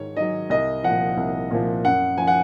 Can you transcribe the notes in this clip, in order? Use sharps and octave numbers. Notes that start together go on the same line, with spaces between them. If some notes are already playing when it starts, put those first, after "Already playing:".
Already playing: G#2 D#3 C#5
D#3 F#3 D#5
C2 D#5
A#2 F3 F#5
C2
A#2 F3
F#2 F#5
F3 G#5
F#5